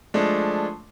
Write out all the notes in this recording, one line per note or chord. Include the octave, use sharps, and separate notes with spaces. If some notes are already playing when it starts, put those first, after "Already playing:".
F3 G#3 A3 D4